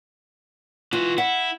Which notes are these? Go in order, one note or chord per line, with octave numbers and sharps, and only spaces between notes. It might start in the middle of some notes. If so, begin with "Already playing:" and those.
E3 F4 F#4
E4 F#5